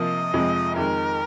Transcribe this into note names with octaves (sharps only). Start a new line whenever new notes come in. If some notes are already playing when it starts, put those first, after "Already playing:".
Already playing: C3 F3 A#3 F4 D#5
F2 C3 F3 G#3
F2 D#3 G#3 A#4